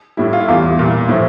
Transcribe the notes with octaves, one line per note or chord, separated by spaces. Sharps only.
A2 G3 E4
F4
E4
E2 E3 G3 F4
A#2 G3
A2 F3 E4